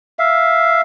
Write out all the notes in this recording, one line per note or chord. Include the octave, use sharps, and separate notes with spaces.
E5 F5